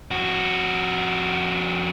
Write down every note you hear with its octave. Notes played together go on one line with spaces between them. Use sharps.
F2 F#4